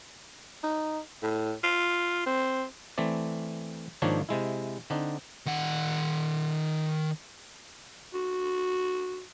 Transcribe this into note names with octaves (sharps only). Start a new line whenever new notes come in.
D#4
A2
F4
C4
E3 A3 C4 D5
G#2 D#3 F3 A#3 D4 C#5
C3 G#3 E4
D3 C4 D4 D#4
D#3 F#5
F#4